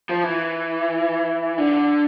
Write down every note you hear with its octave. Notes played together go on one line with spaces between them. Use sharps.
F3
E3
D3